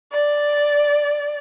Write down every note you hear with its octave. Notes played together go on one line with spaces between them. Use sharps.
D5